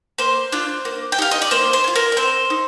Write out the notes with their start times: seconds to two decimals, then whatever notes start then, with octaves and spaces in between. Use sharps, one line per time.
0.18 A#3 C5
0.52 D4 F4
0.85 A#3
1.12 G5
1.18 D#4 G4 F5
1.31 D#5
1.42 D5
1.51 A#3 C5
1.73 C5
1.84 G#4
1.88 F4
1.96 A#4
2.12 D5
2.17 C4 C5
2.50 D#4